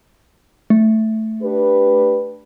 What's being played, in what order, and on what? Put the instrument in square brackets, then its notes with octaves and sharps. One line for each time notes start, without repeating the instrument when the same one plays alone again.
[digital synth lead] A3
[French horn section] D4 G4 B4